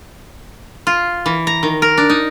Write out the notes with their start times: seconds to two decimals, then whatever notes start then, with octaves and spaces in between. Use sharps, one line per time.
0.87 F4
1.26 E3
1.47 A#5
1.63 D#3
1.82 A#4
1.98 D4
2.10 D#4